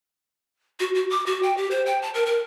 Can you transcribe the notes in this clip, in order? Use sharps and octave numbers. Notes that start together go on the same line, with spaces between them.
F#4
F#4
D6
F#4
G5
G4
C5
G5
A5
A#4
A#4